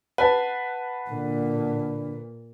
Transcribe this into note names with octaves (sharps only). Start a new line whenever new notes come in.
B4 F#5 A5
A#2 D3